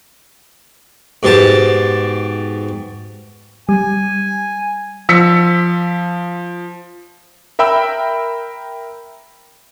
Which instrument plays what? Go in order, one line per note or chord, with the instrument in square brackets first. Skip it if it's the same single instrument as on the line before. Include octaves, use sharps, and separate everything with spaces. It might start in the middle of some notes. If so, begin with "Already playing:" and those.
[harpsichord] G#2 B2 G4 A5
[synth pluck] G3 [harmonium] G#5
[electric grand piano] F3 [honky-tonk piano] E6 B6 C#7
[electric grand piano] A#4 E5 G5 B5 E6